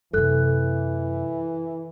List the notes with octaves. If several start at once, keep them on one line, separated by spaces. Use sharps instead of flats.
F#2 C3 E3 A4 F#6